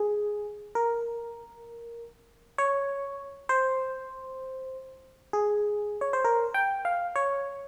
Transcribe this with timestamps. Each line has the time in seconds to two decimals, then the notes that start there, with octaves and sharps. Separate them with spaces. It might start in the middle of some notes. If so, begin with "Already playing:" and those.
Already playing: G#4
0.75 A#4
2.58 C#5
3.49 C5
5.33 G#4
6.01 C#5
6.13 C5
6.25 A#4
6.54 G5
6.85 F5
7.16 C#5